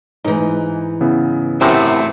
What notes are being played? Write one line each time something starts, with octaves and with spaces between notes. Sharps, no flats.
G#2 E3 D#4
C#3 B3 E4
F#2 A2 C3 A3 C4